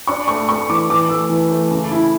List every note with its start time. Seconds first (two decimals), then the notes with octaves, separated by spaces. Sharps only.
0.07 D4 C#6
0.28 A3 C#6
0.49 A3 C#6
0.69 E3 D6
0.90 E3 D6
1.09 A3 E6
1.30 E3
1.50 A3
1.71 C#3
1.92 E4